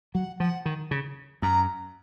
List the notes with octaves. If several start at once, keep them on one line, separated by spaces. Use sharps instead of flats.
F#3 F#5
F3 F#5
D#3
C#3
F#2 A#5